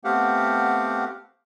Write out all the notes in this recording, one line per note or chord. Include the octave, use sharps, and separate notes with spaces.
A3 B3 C4 G4 F5 F#5